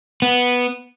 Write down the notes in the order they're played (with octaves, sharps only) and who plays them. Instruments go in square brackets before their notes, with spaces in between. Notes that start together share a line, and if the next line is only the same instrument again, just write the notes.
[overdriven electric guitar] B3